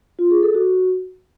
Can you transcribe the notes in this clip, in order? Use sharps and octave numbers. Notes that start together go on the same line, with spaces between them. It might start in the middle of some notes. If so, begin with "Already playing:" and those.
F4
G#4
A4
F#4